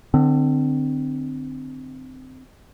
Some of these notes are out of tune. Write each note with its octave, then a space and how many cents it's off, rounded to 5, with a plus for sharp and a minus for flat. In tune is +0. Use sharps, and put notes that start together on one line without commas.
D3 +25 C4 -15